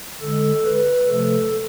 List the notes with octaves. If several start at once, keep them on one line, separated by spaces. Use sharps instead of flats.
D3 G#3 A4
B4
C3 F3 A3 A4